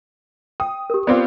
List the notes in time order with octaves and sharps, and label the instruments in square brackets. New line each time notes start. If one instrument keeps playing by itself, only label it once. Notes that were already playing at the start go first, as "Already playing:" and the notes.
[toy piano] G5 [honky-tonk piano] D#6
[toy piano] G4 A#4
[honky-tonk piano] B3 C4 F4 [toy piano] D5 D6